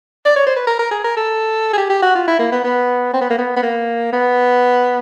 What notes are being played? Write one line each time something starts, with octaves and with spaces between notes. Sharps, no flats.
D5
C#5
C5
B4
A#4
A#4
G#4
A#4
A4
G#4
G4
G4
F#4
F4
E4
A#3
B3
B3
C4
B3
A#3
B3
B3
A#3
B3